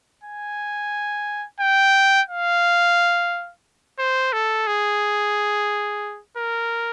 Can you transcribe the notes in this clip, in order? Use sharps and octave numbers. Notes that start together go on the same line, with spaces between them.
G#5
G5
F5
C5
A4
G#4
A#4